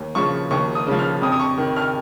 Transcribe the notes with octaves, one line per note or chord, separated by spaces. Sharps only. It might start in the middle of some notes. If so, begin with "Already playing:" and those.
Already playing: D#2
C#3 F3 C#6
D#2 C#6
D#6
C#3 F3
F6
F2 D#6
D#6
C#6
D#3
F6